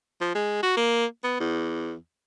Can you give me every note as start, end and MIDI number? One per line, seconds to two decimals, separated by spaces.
0.21 0.34 53
0.35 0.61 56
0.63 0.76 66
0.77 1.06 58
1.24 1.36 59
1.40 1.94 40